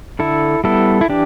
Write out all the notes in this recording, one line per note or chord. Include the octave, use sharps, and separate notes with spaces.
D3 E4 A4
G3 B3 E4 A4
E4
E3 D4 G4